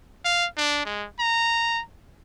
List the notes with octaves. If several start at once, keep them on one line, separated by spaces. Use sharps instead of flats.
F5
D4
G#3
A#5